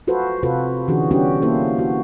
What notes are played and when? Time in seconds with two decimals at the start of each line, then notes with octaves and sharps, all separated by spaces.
0.07 F4 F#4 A4 B4 C5
0.43 C3 F4 F#4 A4 B4 C5
0.88 D3 E3 C#4 D4 F#4 G#4
1.11 G3 B3 C#4 D4 F#4 G4
1.42 A#3 C#4 E4 A4 C5
1.79 F#4